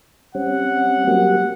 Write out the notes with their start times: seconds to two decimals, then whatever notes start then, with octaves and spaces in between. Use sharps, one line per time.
0.35 G3 C4 C#4 F#5
1.07 F#3 A#3 G4